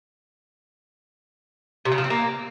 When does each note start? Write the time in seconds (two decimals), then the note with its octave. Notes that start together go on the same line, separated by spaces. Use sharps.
1.85 C3
1.92 C#3
1.98 F3
2.04 C4
2.10 A#3